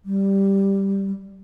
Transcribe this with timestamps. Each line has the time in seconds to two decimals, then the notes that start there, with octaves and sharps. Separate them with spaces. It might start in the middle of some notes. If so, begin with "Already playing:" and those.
0.05 G3